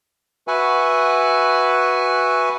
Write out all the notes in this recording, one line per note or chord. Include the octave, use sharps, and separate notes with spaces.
F#4 B4 E5 F#5 G#5